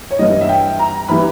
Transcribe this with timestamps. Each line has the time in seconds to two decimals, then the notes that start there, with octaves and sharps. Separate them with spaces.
0.11 C#5
0.19 G2 E3 G3 D#5
0.41 E5
0.49 G5
0.79 A#5
1.08 E3 G3 B5